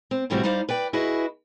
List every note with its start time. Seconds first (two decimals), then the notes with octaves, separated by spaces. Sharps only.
0.11 C4
0.30 A2 C3 E3 G3 C4 F#4
0.43 G3 D#4 C5 D5 F5
0.69 B4 D5 G5
0.93 E4 F#4 G#4 B4 D#5